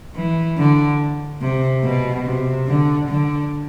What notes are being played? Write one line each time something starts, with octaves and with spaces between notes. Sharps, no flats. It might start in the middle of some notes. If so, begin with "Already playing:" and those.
E3
D3
C3
B2
C3
D3
D3